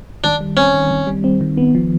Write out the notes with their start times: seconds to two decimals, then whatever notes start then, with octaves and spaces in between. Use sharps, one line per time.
0.24 D#3 D4
0.41 G3
0.57 C4 C#4
0.74 D#3
0.91 D#3
1.07 G3
1.24 C4
1.41 D#3
1.57 B3
1.75 F3